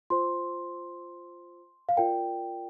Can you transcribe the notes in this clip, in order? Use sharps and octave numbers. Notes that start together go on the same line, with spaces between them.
F4 C5 C6
F5
F4 A#4 D5 G5